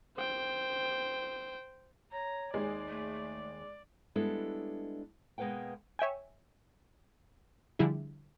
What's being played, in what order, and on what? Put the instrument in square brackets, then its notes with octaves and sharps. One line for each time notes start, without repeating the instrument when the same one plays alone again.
[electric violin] C5 G5
[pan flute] C#5 [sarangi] A#5
[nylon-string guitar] D#2 D#3 G#4 [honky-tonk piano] G#3 [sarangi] D5
[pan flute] A3
[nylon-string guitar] G3 G#3 B3 D4 E4 A4
B2 G#3 A#3 B4 F#5 G5
[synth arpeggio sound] C#5 E5 G5 G#5
D3 F3 G3 E4 G#4